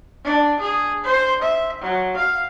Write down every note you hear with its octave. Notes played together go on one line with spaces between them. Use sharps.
D4
G#4
C5
E5
F#3
F5